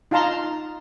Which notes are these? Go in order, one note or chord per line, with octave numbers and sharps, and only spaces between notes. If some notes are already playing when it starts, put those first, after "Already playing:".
D#4 F4 F5 A5 A#5 C6